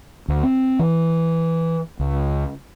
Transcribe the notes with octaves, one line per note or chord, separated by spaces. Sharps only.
D2
C4
E3
C#2